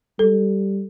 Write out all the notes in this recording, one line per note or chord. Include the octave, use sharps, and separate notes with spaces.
G3 A4